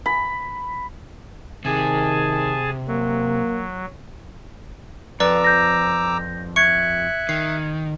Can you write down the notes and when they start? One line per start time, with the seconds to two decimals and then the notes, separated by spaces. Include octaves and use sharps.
0.06 B5
1.65 C3 D#3 G#4 G#5 A5
2.88 F#3 A#3
5.20 F2 B4 D5 A#5 D6 E6
5.44 G6 A#6
6.56 E5 C#6 F#6 G#6 C#7
7.29 D#3 C7